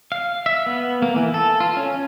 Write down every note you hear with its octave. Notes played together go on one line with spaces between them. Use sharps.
F5
E5
B3
A#3
E3
A4
F4
C#4